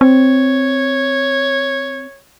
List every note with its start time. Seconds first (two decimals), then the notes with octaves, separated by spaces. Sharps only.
0.01 C4 C#5